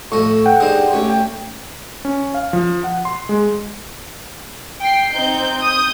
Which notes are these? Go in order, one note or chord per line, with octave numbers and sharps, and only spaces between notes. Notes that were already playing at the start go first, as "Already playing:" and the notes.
A2 F3 A4 D#5 C#6
F#5 G5
D4 D#4 G4 G#4 C5 D#5
A3 C#4 G4 C#5
G5
C#4
F5
F3
F#5
C6
G#3
G5 C7
C4 D#4 G6
D#6 G6